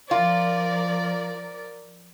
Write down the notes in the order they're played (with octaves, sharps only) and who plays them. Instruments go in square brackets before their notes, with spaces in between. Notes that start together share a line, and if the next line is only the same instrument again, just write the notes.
[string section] F3 A#4 D5 [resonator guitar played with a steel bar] F4